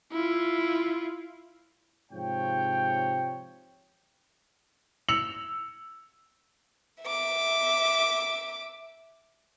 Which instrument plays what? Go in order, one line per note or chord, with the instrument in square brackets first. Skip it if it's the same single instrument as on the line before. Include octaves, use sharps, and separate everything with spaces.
[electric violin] E4 F4
[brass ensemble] G#2 C3 F3 C#5 G5
[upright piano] E6 C#7 F7 F#7
[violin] E5 D6